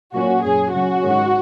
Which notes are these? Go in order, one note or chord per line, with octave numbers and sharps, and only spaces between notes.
A#2 F#3 A#3 C#4 F#4
F#2 F#3 C#4 G#4
C#3 F#3 C#4 F#4
G#2 D#3 G#3 C#4